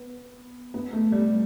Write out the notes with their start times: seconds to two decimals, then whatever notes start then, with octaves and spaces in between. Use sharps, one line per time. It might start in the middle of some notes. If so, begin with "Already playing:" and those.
Already playing: B3
0.74 B3
0.93 A3
1.12 G3